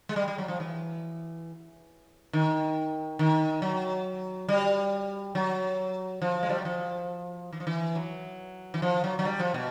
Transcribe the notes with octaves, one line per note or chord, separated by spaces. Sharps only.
G#3
G3
G3
F#3
F3
E3
D#3
D#3
F#3
G3
F#3
F3
G#3
G3
F#3
F3
E3
F3
E3
F#3
E3
F3
F#3
F#3
G3
F3
B2